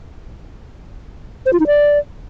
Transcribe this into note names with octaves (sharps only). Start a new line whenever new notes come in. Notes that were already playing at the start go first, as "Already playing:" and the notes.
C5
F4
D#4
D5